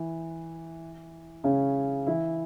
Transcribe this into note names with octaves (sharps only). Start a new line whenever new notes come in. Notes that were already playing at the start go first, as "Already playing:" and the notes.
Already playing: E3 E4
C#3 C#4
E3 E4